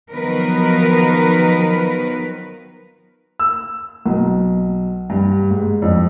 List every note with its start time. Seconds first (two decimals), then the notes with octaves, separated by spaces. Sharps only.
0.11 D#3 F3 F#3 B3 A#4 B4
3.39 E6
4.06 B1
5.10 G2
5.51 G#2
5.82 F2